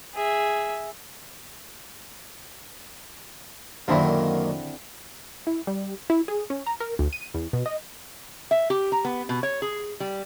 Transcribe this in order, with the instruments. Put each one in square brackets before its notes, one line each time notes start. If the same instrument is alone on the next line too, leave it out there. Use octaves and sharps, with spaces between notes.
[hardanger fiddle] G#4 E5
[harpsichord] F#2 A#2 D#3 [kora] D3 C4 E4
[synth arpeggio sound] E4
G3
E4
G#4
C#4
A#5
A#4
D2
D#7
E2
B2
D#5
[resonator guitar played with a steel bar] E5
G4
A#5
B3
B2
C#5
G#4
G3